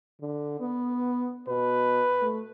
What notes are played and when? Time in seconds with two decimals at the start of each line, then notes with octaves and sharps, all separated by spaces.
0.21 D3
0.60 B3
1.48 B2 B4
2.22 A3